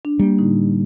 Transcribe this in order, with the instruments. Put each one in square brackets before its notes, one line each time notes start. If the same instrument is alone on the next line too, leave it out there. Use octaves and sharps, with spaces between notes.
[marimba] D4
[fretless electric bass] G3 [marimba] A#3
[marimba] A2 D3 D#4